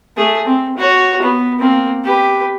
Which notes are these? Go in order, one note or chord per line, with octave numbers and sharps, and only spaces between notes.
A3 G#4
C4
F#4 C#5
B3
A#3 C4
G4 B4